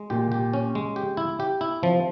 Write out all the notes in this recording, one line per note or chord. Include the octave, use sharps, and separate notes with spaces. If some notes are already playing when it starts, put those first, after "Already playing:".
Already playing: G#3
A#2 G4
G4
C#4
G#3
G4
E4
G4
E4
C3 F3